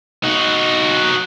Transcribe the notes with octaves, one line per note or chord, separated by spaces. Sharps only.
D#4 F#4